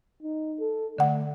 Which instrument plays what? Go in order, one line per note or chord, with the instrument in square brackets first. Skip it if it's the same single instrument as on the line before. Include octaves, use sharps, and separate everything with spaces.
[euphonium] D#4
A4
[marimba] D3 F#5 [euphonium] A3